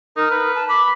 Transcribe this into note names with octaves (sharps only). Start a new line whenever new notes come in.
D#4 A#4
B4
A5
B5 D6